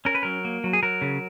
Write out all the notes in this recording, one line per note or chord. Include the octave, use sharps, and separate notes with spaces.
C#4 A#4
B4
F#3 A#4
A#3
F#3
G#4
F#3 A#4
C#3